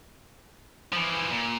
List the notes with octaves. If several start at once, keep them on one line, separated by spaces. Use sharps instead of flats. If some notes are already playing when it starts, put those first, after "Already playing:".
E3 F3
A#2